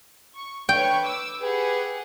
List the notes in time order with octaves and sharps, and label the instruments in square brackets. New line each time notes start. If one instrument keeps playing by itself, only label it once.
[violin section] C#6
[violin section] B4 C#5 C#6 [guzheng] G5
[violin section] D6 E6
[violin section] G4 G#4 F#5 [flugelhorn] B4